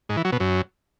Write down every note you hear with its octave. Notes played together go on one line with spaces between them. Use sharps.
G#2
E3
F#3
B2
F#2